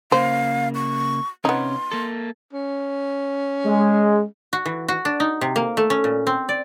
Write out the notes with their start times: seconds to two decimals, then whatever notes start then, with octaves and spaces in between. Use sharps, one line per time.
0.12 C#3 A#3 C5 F5
0.75 C#6
1.45 C3 B3 C#4 D#4 C6
1.91 A#3 A4
2.53 C#4
3.66 G#3
4.53 F#4
4.66 E3
4.88 F#4
5.05 D4
5.20 D#4
5.41 C3
5.56 A#3
5.77 A3
5.90 C#4
6.04 A#2
6.27 C4
6.49 D5